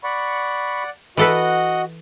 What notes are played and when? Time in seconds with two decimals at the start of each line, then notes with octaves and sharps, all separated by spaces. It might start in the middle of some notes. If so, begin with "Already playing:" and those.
0.04 D5 F#5 B5 C#6
1.17 E3 F#4 A4 B4 D#5 F#5